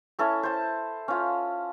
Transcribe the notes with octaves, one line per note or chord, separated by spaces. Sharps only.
C#4 E4 A4 C#5
C5 A5
C#4 F4